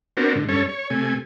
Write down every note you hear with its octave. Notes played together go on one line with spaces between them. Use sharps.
B3 C4 D4 F#4 A#4
G#2 D3
G2 C#4 A4 C#5
C#5
C3 A3 G#5